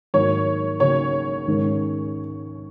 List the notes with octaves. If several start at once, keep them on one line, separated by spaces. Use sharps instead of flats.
G#2 D#3 F#3 A#3 C#5
C#3 F#3 A#3 D#4 C#5
G#2 D#3 G#3 C#4